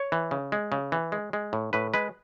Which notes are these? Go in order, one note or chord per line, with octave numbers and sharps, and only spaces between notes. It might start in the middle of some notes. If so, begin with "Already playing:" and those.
Already playing: C#5
E3
C#3
G#3
C#3
E3
G#3
G#3
A2
A2 B4
G#3 B4